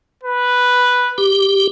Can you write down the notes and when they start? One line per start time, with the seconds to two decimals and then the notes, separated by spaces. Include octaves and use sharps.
0.24 B4
1.18 G4